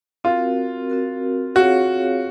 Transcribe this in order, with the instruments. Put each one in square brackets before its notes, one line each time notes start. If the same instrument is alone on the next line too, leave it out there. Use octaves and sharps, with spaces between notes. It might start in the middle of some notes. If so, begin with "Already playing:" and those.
[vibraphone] C4 F#4 A#4 [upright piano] F4
[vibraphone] C4 F#4 A#4
[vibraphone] C4 F4 G#4 C#5 F5 [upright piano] F#4